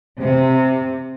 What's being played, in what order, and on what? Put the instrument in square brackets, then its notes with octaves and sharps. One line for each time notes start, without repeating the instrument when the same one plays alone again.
[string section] C3